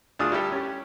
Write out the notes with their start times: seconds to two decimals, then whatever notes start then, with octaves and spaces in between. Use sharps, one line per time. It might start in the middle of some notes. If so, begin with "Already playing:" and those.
0.19 D2 D4 F4 G#4 D#6
0.32 G3 E4 G4 A4
0.52 C#4 G4